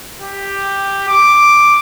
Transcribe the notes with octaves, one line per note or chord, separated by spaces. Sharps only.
G4
D6